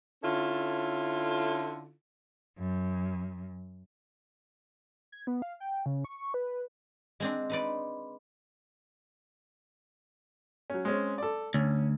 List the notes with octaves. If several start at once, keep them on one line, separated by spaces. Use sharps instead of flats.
D3 C#4 E4 F4 A4
F#2
G#6
B3
F5
G5
C#3
C#6
B4
G#3 C4 D4
D#4 B4 D5
F#3 C#4
G#3 C4 C#4
A4 D5
D2 C#4